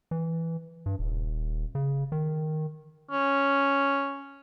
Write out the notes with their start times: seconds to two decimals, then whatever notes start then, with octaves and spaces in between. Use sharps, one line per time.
0.11 E3
0.86 G2
0.99 D#1
1.75 C#3
2.12 D#3
3.11 C#4